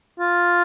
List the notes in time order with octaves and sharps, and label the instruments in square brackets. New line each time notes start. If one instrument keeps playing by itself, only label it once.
[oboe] F4